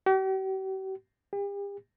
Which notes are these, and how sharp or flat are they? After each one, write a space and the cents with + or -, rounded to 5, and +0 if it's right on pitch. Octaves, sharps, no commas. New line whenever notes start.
G4 -45
G4 +40